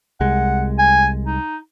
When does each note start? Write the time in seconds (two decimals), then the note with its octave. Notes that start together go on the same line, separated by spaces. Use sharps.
0.21 C2 G#3 F#5
0.79 G#5
1.26 D#4